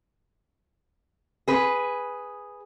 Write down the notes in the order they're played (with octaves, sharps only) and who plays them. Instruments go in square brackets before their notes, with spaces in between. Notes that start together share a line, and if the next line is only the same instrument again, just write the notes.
[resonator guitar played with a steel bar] G#4 B4